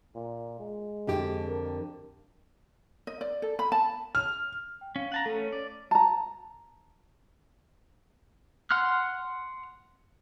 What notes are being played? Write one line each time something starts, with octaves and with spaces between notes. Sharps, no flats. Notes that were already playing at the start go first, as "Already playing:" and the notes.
A#2
G#3
F2 D3 G4
A#4
D#5
D5
A4
B5
A5
F6
G5
C#4 F5
F#5 A5 A#5
A3 C#4 A4
C#5
D5
A5 A#5
F#5 C6 F6 F#6